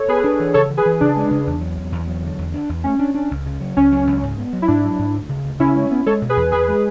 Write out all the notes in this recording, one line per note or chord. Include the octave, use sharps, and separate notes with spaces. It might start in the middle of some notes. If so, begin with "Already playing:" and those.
Already playing: A4 C#5
B3 G#4 B4
D4
E3
C#3 A4 C#5
E3
G#4 B4
E3
C#3 D4
G#3
C#3
E2
F#3
E2
E2
F#3
D3
E2
D4
E2
A3 C#4
D4
D4
C#2
C#3
F#3
C#2 C#4
F#3
C#2
G#2
B3
F#3
E4
G#2 D4
F#3
G#2
D2
C#3
D2
C#3 C#4 E4
G#3
B3
G#3 A4 C#5
B2
G#4 B4
E2
E2 G#4 B4
G#3